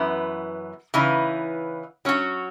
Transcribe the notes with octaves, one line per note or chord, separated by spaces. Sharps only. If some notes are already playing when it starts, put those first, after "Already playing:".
Already playing: F#2 E3 B3
C#3 E3 B3 D#4
F#3 C#4 F#4